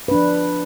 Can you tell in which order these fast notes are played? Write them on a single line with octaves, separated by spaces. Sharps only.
B4 D4 F3